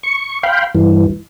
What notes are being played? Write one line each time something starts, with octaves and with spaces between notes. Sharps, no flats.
C#6
F5 G5 B5 C6
G2 E3